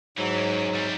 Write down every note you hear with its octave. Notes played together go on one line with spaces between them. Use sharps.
G#2 E3 F#3
F#2
G3 C4